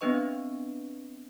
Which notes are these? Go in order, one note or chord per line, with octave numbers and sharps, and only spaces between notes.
B3 C4 D4 B4 D#5 C#6